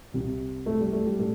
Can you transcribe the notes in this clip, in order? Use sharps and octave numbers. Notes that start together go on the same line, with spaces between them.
C2 C3
A3
G3
A3
G3
A2 A4